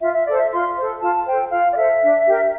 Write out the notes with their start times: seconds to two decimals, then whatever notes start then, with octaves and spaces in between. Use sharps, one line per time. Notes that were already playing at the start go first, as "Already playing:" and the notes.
0.01 F4 E5
0.14 E5
0.26 A4 C5 D5
0.38 E5
0.51 F4 C6
0.76 A4 C5
1.01 F4 A5
1.26 A4 C5 G5
1.51 F4 F5
1.71 D5
1.76 A4 C5 E5
2.01 D4
2.26 G4 A#4